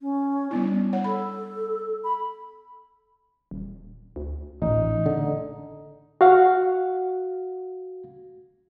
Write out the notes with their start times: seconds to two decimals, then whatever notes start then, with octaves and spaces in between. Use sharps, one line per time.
0.01 C#4
0.51 G3 B3 D4 E4
0.93 C#5 F#5
1.04 A4 B5
2.04 B5
3.51 D#1
4.16 D2
4.62 A1 A#2 D#4
5.06 D3
6.21 F#4 F5 F#5